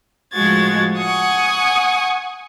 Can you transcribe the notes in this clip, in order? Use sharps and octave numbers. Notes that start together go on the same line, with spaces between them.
A2 F3 G#3 F#4 G#6 A6
F#5 G#5 C#6 D#6